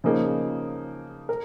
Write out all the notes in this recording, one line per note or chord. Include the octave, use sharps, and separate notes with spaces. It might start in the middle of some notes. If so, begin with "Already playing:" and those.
C#3 F3 A#3 D#4 G#4
A#4